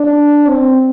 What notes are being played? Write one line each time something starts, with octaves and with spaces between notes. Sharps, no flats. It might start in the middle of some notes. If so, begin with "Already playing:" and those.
Already playing: D4
C4